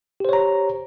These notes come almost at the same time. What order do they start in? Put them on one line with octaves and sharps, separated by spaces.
G4 C5 C#5 A#5